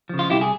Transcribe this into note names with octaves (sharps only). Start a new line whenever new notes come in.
C#3 F3
F4
C2 E4 G4
G#4